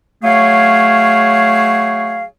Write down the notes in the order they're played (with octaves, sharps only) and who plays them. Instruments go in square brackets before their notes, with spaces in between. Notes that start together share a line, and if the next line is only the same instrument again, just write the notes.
[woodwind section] F#3 A3 G#4 C#5 F5